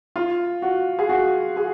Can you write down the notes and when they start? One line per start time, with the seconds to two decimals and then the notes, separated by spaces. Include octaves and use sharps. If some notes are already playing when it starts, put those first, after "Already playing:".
0.16 F4
0.62 F#4
0.99 G#4
1.09 F#4
1.57 G#4